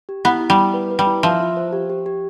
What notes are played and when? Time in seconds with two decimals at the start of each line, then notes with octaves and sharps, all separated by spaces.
0.09 G4
0.25 B3 E4
0.41 E4
0.50 G3
0.57 E4
0.74 B4
0.91 B4
0.99 G3
1.07 E4
1.23 F3 E5
1.41 F4
1.57 C5
1.73 G4
1.90 G4
2.06 G4